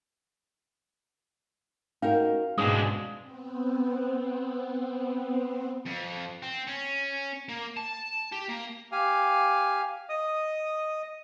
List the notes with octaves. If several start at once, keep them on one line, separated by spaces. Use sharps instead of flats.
C#4 D#4 F#4 A#4 F5
G#2 B2 G#3 C#4 D4 G#4 D#6
B3 C4
F2
C4
C#4
A#3
A5
G4
A#3
G4 F5 G#5
D#5 D#6